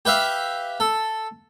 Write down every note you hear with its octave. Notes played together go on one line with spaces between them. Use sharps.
G4 B4 E5 F5
A4